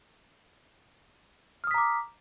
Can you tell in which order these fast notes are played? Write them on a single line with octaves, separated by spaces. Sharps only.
F6 D#6 B6 A#5 D6